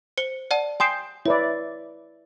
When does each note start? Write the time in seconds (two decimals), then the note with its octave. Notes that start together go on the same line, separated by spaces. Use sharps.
0.18 C5 C#7 G7
0.51 D5 F#5 A5
0.80 G5 G#5 C6 D#6 E7
1.26 E4 B4 C#5 D5